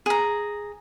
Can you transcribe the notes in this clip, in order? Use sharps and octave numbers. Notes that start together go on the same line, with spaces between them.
G#4 A#5